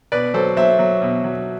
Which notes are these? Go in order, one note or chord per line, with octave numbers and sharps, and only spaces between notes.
B2 B4 D5
F#3 A4 C5
F#3 C5 E5
F#3
B2
F#3